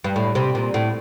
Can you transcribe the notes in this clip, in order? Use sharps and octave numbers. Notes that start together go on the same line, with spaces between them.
G2
A2
C3
A#2
A2